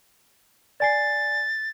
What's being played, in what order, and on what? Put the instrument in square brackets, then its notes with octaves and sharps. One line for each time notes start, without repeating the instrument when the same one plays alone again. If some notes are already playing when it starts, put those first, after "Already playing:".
[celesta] D5 G#5 C7 [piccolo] A6